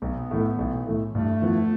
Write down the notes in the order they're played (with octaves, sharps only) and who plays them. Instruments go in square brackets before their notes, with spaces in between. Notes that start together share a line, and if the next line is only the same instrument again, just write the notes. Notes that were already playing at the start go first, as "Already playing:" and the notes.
[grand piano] B1 [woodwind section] B3
[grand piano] A2 E3 A3
B1
A2 E3 A3
[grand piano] G2 [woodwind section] A3
[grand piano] F3 B3 E4